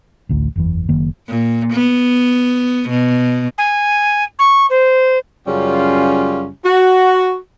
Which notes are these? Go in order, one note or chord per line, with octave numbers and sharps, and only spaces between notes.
A1 D2 A2
F#1 E2 E3
F#1 D#3 A#3
A#2
B3
B2
G#5
C#6
C5
F#2 C#3 G3 C#4 F4
F#4